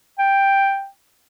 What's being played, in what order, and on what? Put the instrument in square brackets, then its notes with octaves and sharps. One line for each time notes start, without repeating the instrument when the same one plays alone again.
[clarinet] G5